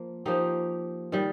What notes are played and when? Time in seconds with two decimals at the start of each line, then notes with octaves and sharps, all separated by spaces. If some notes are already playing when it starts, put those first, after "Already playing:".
Already playing: F3 A#3
0.25 F3 A#3 D#4 G4
1.12 D#3 G3